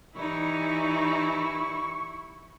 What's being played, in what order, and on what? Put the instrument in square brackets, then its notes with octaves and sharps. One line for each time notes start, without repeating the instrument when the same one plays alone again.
[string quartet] E3 G3 D#4 [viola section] E4 [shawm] C#6